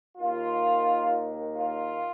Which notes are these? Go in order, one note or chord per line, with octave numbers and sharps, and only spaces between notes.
D#2 D#3 F4
F4